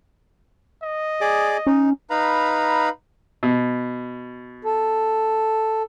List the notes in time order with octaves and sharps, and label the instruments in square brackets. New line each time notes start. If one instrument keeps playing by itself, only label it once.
[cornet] D#5
[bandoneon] G#4 D5 D6
[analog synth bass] C#4 [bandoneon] D#4
[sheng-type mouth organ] D#4 B4 F5 A#5 B5
[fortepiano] B2
[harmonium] A4